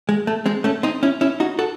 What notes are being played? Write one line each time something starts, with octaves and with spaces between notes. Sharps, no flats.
G#3
A3
G#3 C4
A3 C#4
C4 D#4
C#4 E4
C#4 E4
D#4 F#4
F#4 A4